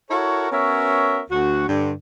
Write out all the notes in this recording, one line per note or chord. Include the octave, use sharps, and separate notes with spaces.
E4 F#4 A4 A#4 C#5
B3 C#4 F#4 A#4 C#5 E5
D2 F#4
G2 D3